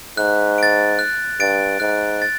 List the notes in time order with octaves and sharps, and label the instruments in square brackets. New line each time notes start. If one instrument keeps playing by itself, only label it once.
[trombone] G#2 [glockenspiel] F#6
[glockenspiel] A6 D7
F#6
[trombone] G2 [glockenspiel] A6 D7
[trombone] G#2 [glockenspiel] F#6
[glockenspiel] A6